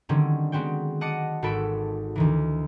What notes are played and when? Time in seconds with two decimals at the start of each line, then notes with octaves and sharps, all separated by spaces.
0.09 D3 D#3 F#3 G3 C4 C#4
0.52 G#3 B3 C4 F#4 G5
1.01 D#5 F#5 A5 D6 C#7 D#7
1.42 G#1 F#4 A4 B5 D7
2.16 D2 D#3 E3